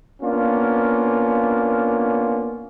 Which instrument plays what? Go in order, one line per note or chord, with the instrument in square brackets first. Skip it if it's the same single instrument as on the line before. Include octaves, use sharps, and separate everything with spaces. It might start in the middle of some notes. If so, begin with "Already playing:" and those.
[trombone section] A#3 B3 C#4 D4 F4